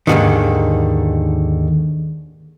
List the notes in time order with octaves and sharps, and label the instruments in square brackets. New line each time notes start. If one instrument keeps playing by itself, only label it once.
[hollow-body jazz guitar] D#2 G#2 B2 D3 D#3